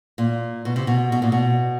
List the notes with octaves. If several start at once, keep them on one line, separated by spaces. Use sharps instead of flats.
A#2
B2
C3
B2
B2
A#2
B2